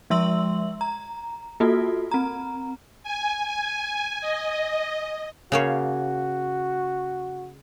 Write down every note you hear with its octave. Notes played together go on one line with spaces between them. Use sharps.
F3 G#3 E5 C6 E6 F#7
A#5
A#3 F4 F#4 A4
C4 A#5
G#5
G#5
D#5
C#3 A#3 F#4 C#5